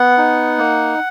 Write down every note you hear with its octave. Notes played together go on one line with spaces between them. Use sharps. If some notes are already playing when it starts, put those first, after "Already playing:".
Already playing: B3 F#5
D#4
A#3